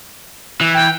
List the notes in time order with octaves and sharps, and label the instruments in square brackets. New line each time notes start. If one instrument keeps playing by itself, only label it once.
[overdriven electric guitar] E3
[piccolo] G5